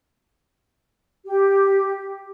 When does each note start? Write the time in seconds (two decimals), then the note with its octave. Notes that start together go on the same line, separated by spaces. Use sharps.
1.26 G4